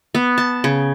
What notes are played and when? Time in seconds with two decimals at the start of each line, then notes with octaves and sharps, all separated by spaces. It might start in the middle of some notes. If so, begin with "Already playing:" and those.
0.15 B3
0.38 A5
0.64 C#3